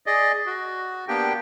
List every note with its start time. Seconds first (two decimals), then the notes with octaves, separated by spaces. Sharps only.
0.06 G#4 D5 D#5
0.46 F#4
1.08 A#3 B3 D4 G4 G5